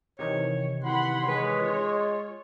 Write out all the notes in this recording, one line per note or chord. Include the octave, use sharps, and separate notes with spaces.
C3 D#3 E3 C#5
E4 F#4 G4 B4 F#5 B5 C6
G#3 B4 C#5
F4